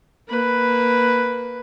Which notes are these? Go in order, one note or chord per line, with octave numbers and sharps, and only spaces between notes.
A#3 B4